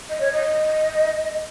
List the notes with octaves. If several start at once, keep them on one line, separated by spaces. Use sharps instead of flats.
D#5
C#5
D#5